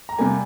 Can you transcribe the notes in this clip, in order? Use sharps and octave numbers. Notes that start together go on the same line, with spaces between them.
A#5
C3 G3 A#3 G#5